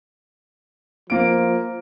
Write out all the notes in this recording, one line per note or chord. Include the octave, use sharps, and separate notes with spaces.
F3 A#3 F4 D7